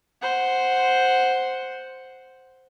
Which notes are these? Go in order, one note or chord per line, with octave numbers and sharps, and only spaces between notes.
C5 F#5